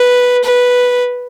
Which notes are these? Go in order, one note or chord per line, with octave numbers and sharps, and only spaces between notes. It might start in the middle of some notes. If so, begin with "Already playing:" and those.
Already playing: B4
B4